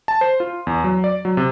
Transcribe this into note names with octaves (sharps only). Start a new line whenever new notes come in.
A5
C5
F4
E2
F#3
D5
F#3
C3